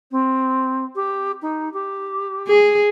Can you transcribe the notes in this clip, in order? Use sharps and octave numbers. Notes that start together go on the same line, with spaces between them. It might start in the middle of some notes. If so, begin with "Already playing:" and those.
C4
G4
D#4
G4
G#4